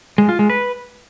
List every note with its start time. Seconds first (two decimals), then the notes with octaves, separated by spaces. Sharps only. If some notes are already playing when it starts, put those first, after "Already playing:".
0.18 G#3
0.29 F4
0.39 G#3
0.50 B4